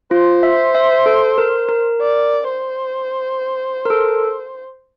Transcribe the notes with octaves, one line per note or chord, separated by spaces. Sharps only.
F4 C5
E5
E5
A4
A#4
A#4
D5
C5
A#4
A4